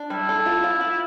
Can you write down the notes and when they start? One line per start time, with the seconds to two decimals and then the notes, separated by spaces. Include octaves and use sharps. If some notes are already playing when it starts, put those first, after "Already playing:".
Already playing: D4
0.10 G3 E4
0.29 A4
0.46 F4
0.64 F4
0.81 F4